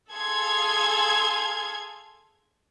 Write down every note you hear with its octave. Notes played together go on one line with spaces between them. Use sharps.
G#4 A4 F5 C6 G#6